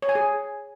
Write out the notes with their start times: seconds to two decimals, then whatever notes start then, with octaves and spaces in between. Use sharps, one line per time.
0.02 C#5
0.09 G#5
0.15 G#4